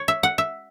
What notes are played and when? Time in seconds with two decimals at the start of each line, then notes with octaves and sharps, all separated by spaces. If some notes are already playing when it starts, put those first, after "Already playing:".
Already playing: C#5
0.08 E5
0.23 F#5
0.38 E5